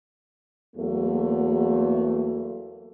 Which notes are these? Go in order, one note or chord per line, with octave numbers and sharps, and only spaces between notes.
E2 F#3 A3 A#3